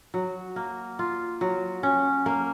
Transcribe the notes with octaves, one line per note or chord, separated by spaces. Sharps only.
F#3
A#3
F4
F#3
C#4
A#3